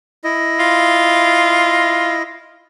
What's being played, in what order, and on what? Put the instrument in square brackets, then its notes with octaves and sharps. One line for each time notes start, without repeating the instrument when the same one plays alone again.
[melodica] E4 D#5
[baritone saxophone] F4